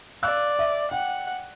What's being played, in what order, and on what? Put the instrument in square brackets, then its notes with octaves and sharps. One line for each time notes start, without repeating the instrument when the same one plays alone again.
[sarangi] D5 [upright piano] F5 E6 F#6
[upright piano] E5
[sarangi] F#5 [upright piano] G5